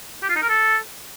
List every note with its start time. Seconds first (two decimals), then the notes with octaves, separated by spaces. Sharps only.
0.23 G4
0.29 F4
0.36 D#4
0.42 A#4
0.49 A4